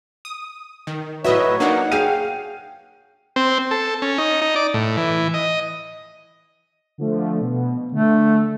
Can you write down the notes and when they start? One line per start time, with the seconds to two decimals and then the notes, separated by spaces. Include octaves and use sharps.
0.25 D#6
0.87 D#3
1.24 A2 F#3 B4 C#5 D#5 E5
1.60 A#3 D4 D#4 F#5
1.92 G#4 F5 G5 D#7
3.36 C4
3.71 A4
4.02 C#4
4.18 D#4
4.41 D#4
4.56 D5
4.74 A2
4.97 E3
5.34 D#5
6.98 D3 F3 A3
7.41 B2
7.92 D3 A3